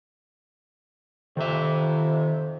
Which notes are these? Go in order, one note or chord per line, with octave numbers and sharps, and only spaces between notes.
F2 C3 D#3 E5